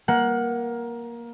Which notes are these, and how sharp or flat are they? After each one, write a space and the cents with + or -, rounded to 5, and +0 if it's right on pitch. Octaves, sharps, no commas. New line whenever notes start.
A#3 +15 F#5 +0